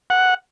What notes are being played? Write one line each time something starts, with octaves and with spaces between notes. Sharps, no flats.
F#5